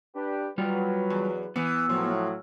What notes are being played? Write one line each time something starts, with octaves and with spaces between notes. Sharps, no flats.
D4 G4 B4
F#3 G3 F4 B4
E2
E3 B3
A2 F3 F#3